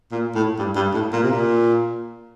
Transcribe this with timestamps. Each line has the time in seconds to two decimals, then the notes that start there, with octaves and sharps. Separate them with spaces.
0.11 A#2
0.35 A2
0.58 G2
0.76 G2
0.94 A2
1.13 A#2
1.22 C3
1.30 A#2